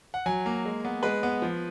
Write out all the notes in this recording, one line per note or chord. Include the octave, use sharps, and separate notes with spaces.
F#5
F#3 G#5
A#3
G#3
B3
G#3 B4
B3
F3